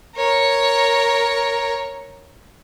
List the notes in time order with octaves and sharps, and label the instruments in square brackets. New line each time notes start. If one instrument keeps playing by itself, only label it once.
[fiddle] A#4 C#5